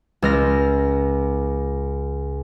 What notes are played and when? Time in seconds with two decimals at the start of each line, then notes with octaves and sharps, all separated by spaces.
0.22 C#2 F6 A#6